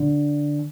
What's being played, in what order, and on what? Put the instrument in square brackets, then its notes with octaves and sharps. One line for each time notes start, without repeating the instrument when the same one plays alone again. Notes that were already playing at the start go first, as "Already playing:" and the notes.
Already playing: [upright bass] D3